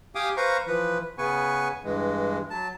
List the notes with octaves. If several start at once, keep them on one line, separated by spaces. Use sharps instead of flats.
G4 F5 G5 G#5 D6 D#6
B4 C5 F5 A#5 C#6
E3 F3 B4
C#3 B3 B4 G#5 C#6
G2 E3 G#3
F#3 A5